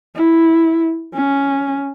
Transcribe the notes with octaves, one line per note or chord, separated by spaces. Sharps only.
E4
C#4